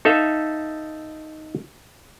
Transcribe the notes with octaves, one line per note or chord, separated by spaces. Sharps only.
D#4 A4 E5 F5